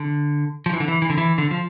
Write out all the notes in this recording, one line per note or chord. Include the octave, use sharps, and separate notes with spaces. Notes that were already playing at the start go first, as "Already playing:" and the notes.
Already playing: D3
F3
E3
D3
E3
E3
D3
E3
D3
F3